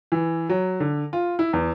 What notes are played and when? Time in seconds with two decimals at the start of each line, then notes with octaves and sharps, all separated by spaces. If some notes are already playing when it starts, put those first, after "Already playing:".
0.12 E3
0.49 F#3
0.80 D3
1.13 F4
1.39 E4
1.53 E2